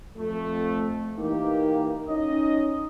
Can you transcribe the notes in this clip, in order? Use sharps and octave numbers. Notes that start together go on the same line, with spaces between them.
F2 A3
E3 A#3 D#4 G4
C#4 D#4 D#5